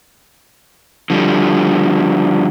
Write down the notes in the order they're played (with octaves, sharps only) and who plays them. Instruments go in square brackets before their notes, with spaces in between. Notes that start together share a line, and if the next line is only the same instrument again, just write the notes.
[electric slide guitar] D3 F3 G3